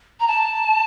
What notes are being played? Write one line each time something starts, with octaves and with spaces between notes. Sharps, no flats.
A#5
A5